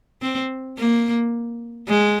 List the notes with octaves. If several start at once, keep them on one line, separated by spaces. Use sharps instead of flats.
C4
A#3
G#3